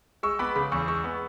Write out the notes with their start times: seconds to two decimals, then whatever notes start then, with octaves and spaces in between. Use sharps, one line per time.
0.23 G#3 C#6 E6
0.39 B3 B5 D6
0.56 C#3 B5 D6
0.72 E2 C#6 E6
0.88 G#3 C#6 E6
1.04 B3